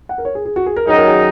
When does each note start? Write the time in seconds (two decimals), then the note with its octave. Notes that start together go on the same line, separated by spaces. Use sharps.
0.09 F#5
0.18 A#4
0.25 C#5
0.35 G#4
0.45 G#4
0.56 F#4
0.66 G#4
0.76 A#4
0.87 F#2 D#3 F#3 D#4 G#4
0.97 A#4
1.07 G#4